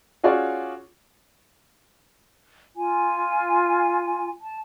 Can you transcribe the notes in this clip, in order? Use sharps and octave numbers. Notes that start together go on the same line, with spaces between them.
C#4 F4 F#4 G#4 C#5 D5
F4 G#5
A5